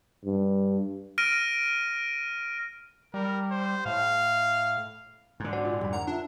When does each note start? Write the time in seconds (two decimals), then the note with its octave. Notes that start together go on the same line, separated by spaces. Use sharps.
0.25 G2
1.18 F6 A#6 D7 D#7
3.14 G3 A#4
3.51 C5
3.85 A2 F5
5.40 G#2 D3
5.53 D4 F#4 C5 D5 F#5
5.64 A#2
5.81 F2 G3 B5
5.93 A#4 C#5 F#5 A#5
6.07 D4 F4 E5